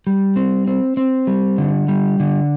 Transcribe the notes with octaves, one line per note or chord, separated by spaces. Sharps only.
G3
C4
C4
C4
G3
D3
G3
D3